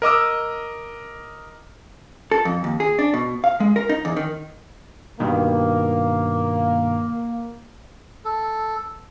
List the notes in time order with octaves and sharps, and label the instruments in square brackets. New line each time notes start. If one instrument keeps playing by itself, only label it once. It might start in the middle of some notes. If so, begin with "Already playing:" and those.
[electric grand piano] A#4 D#5 D6 E6
[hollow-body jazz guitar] A4
F2
D#2
G#4
D4
B2
F5
G#3
A#4
D#4
E2
D#3
[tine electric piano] G2 B2 D#3 [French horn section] A#3
[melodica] A4